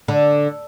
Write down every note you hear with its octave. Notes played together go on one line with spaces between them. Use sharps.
D3